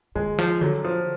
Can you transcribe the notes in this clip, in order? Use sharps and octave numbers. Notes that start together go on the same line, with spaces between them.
D3 G#3
F3
D3 F#3
F3